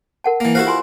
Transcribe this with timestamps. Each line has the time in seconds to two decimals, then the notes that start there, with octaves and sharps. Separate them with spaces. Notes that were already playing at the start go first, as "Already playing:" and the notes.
0.24 A#4 F#5 A5
0.40 E3 A#3
0.55 E4 F#4 G4 C5 F5
0.67 F4 G#5 C6